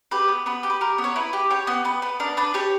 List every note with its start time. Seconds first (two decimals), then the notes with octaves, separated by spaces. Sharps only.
0.11 G4 B4
0.28 B3
0.46 B3 B4
0.63 G4
0.70 B4
0.81 G4 A#4
0.98 B3
1.04 C#5
1.16 E4 B4
1.33 G4
1.50 G4 C#5
1.67 B3
1.85 B3 B4
2.02 B3
2.20 D4 A#4
2.37 D4 B4
2.54 G4 C#5